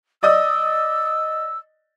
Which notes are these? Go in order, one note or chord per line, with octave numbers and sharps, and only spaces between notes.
D5 D#5 D#6 E6